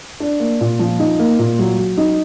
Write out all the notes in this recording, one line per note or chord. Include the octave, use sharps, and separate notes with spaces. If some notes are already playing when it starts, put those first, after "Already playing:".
D4
A#3
A#2
F3
D#4
A#3
A#2
F#3
F#3
D#4